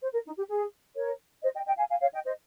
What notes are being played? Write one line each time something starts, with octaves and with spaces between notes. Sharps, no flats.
C5
A#4
D#4
G4
G#4
A#4 C#5
C5 D#5
D#5 G5
D#5 G5
F5 G#5
F5 G#5
C#5 F5
D#5 G5
C5 D#5